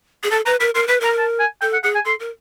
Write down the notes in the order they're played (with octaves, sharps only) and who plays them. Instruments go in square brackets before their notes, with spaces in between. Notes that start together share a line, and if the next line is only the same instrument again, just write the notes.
[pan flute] G#4
[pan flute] A4 [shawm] A5
[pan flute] B4 [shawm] A#5
[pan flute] A#4 [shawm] B5
[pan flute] A#4 [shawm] C6
[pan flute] B4 [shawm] B5
[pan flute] A#4 [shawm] A#5
[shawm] A5
G#5
[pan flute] A4 [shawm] G5
[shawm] F#5
[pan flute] G#4 [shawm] F#5
[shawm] G#5
[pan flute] A4 [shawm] C6
[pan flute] A#4